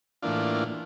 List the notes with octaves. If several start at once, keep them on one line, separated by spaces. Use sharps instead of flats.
A2 E3 A#3 D4 F4